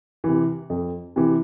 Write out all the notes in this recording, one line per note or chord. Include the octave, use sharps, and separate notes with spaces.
C3 E3
F2
C3 E3